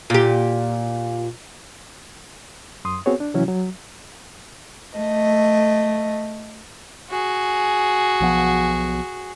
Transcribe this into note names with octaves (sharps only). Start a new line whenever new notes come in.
A#2 G4
F#2 C6 D#6
B3 C4 F#4 G#4 C#5
D4
C3 E3 F#3 C#4 E4 F#4
F#3
A3 D#5
F#4 G#4
B1 F3 B3